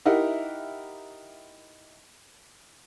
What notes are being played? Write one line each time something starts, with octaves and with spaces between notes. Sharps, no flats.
D#4 E4 G4 A#4 E5 F#5